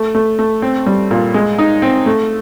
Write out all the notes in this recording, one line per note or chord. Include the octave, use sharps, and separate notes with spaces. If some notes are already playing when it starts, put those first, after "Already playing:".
Already playing: A3
A3
A3
C4
G3
A#2
G#3
D#4
C4
A3